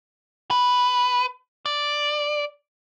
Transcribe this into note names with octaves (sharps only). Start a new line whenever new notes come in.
B4
D5